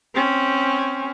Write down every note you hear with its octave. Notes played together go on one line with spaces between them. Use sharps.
C4 C#4